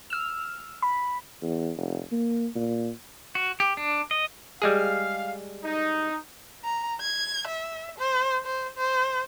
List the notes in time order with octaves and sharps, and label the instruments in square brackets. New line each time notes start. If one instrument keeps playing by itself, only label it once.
[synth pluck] E6 F6
B5
[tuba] E2
F1
A#3
A#2
[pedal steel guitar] F#4
G4
D4
D#5
[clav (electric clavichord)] G3 G#3 G#4 [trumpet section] F5
[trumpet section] D#4
[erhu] A#5
G#6
E5
C5
C5
C5